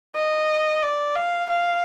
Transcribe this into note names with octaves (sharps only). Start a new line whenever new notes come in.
D#5
D5
F5
F5